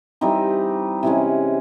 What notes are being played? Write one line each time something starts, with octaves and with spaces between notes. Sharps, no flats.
E3 G3 C4 D#4
C3 E3 G#3 C#4